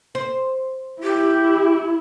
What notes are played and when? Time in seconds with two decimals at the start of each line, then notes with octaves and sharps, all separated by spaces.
0.15 C5
1.02 E4 G4